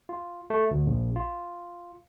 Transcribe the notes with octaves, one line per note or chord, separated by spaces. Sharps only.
F4
A3
D2
A#1
F4